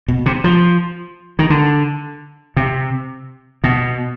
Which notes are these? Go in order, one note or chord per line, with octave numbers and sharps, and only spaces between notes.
B2
C3
F3
D#3
D3
C3
B2